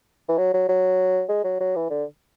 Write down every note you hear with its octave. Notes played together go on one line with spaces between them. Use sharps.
E3
F#3
F#3
F#3
G#3
F#3
F#3
E3
D3